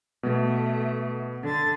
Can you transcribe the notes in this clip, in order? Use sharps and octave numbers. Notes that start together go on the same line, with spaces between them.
B2 A3 B3
D3 A6